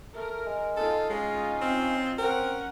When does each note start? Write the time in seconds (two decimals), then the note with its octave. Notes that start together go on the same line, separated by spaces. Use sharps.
0.16 A3 A#4
0.46 G#3
0.77 D#4 F4 A4
1.10 G#3 C#4
1.61 C4
2.19 C4 C#4 A#4 F#5